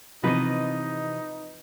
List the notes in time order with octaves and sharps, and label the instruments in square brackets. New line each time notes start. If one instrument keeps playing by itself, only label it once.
[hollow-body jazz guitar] C3 E3 [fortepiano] F3 B3 [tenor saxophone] D#4 [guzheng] B4 D#5